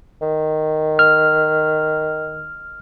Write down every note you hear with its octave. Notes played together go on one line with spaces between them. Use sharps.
D#3
F6